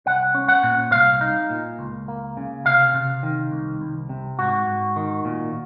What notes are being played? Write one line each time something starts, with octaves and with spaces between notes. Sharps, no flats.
C2 F#5
C#4
F#5
A#2
C2 F5
D#4
A#2
C#2
A#3
C#3
C3 F5
C3
D#3
C2
C2
C3
G#2 F#4
G#2
D#3
A#2